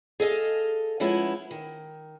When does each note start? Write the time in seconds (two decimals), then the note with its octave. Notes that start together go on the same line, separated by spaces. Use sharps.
0.20 G#4 A4 D#5 F5
1.00 F3 G#3 B3 C#4 E4
1.51 D#3